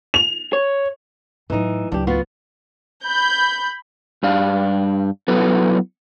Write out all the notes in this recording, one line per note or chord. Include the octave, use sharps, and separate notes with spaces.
F7
C#5
A2 E3 F#3 D#4
C#2 F#3 D4 G4
B3 F4 F#4
B5 G6
G2 D4 F5
F#3 B3 E4 A4 B4